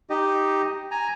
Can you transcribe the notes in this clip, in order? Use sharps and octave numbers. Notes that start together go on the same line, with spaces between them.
D#4 G4 D#5
G#5 A#5